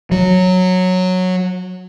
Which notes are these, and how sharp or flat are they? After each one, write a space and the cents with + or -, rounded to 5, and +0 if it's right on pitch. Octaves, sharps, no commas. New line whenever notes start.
F#3 -10